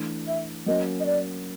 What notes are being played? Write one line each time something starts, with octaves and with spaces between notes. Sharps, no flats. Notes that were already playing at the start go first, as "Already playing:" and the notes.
Already playing: E3 A3 D4
E5
F#3 A#3 C#4 D#5
D#5
D5